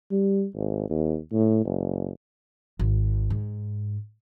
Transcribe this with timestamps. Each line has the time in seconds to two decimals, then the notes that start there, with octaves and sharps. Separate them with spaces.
0.12 G3
0.55 G#1
0.90 D#2
1.33 A2
1.65 F#1
2.79 G#1
3.30 G#2